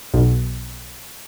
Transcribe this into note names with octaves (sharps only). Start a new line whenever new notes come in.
B1